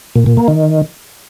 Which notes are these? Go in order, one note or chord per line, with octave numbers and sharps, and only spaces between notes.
A#2
A#2
A#3
D#3